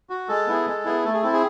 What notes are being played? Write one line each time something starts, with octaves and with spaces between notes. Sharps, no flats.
F#4
G#3 A4
B3 E4 G#4
G#3
B3 E4 G#4
A3 A4
G#4
C4 E4 A4
G#4